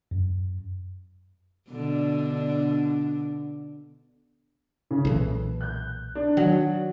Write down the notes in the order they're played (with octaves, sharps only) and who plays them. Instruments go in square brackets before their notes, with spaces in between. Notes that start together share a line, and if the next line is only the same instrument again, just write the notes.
[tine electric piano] F#2
[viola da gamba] B2 D3 D4
[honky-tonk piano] C#3
[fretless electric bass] B1 A#2 E3 [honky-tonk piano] A4 B4
[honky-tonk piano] F#6 G6
D4
[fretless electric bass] D#3 [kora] F#3